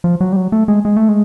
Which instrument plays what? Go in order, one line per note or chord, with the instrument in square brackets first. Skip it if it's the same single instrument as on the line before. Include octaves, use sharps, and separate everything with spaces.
[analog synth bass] F3
F#3
G3
F#3
A3
G#3
G#3
A3
G#3